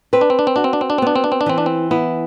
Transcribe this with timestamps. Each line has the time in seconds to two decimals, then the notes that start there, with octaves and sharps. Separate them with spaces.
0.13 C4 B4
0.21 D4
0.30 C4
0.39 D4
0.47 C4
0.56 D4 F#4
0.64 C4
0.73 D4
0.81 C4
0.90 D4
0.98 C4
1.02 B3 D4
1.16 C4
1.24 D4
1.32 C4
1.41 D4
1.46 E3 C4
1.58 D4
1.66 C4
1.91 B3 E4